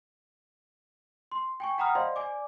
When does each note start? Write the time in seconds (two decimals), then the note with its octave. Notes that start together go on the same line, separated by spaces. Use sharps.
1.31 C6
1.60 G5 G#5 C#6
1.78 F#5 G5 A#5 B5 D#6 F6
1.95 C5 D5 D#5 F5 C6
2.16 D5 G#5 D6